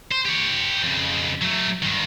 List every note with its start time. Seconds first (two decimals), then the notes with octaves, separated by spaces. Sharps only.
0.11 C5
0.25 G4 C#5
0.84 F2 C#3
1.42 F#3 A3
1.82 G2 D#3